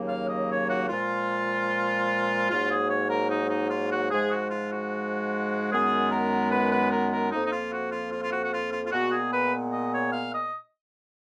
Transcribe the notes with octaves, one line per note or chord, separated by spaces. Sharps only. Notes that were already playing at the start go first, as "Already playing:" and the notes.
Already playing: D#2 C#3 F#3 A#3
F5
D#5
C#5
F#4
A#2 F3 G#3 F4
G#2 F#3 A#3 F4
G#4
C#5
A#4
D#4
D#4
F4
F#4
G#2 F3 G#3 G#4
F#4
F4
F#4
F#2 D#3 G#3 B3 G#4
A#4
B4
B4
A#4
A#4
F2 F3 A#3 D#4
D#4
F4
F#4
F4
F4
F4
F#4
F#4
F4
F4
F4
A#2 G#3 B3 F#4
G#4
B4
D#5
C#5
F5
D#5